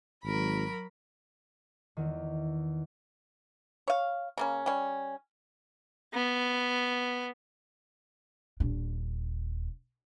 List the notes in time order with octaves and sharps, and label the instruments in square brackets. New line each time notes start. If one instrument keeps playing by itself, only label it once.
[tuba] G#1 [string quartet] F#3 A#4 B5
[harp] E2 D#3
[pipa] C#5 F5
C#3 A#3 C#4
G3 C#4
[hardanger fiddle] B3
[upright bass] D#1 D4